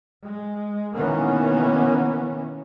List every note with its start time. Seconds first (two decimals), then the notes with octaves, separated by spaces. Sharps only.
0.24 G#3
0.96 B2 D#3 E3 A#3 B3 C#4